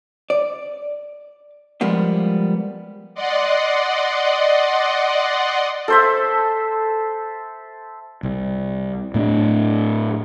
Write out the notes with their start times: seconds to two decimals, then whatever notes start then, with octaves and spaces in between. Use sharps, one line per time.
0.30 D5
1.81 F3 G3 G#3 A#3 B3
3.15 D5 D#5 F#5 C6
5.88 A4 C5 E5
8.23 C2
9.14 A2 A3 C4 D4